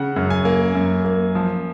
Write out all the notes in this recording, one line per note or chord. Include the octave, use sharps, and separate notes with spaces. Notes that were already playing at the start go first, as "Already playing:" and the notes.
Already playing: C#3 F#5
F#2
G#5
A#3
F#2
A#3
F3